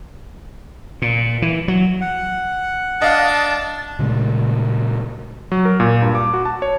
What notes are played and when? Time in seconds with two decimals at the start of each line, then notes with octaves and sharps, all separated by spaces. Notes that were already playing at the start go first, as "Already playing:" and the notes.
1.02 A#2
1.42 E3
1.68 F#3
2.01 F#5
3.02 D4 D#5 F5 A5
3.99 A#2 C#3 G#3 A3
5.52 F#3
5.65 A#4
5.80 A#2
6.02 G2
6.15 D6
6.33 F#4
6.45 A5
6.62 C#5